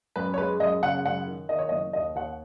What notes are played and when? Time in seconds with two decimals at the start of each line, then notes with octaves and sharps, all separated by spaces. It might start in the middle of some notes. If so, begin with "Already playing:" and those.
0.16 F#2 B4
0.34 C#5
0.38 G#3 B4
0.60 F#2 D#5
0.82 C#3 F#5
1.05 F#2 F#5
1.27 D#3
1.49 D#3 D#5
1.59 C#5
1.69 D#5
1.72 F#1
1.93 D#2 D#5
2.15 D#2 F#5